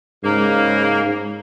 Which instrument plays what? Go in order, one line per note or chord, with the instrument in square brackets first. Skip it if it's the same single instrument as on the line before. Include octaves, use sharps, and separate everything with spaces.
[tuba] G#2 [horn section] C#3 A#3